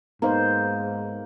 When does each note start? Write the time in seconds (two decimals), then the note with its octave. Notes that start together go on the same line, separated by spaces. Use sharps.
0.22 G#2 A#3 B3 D#4 C5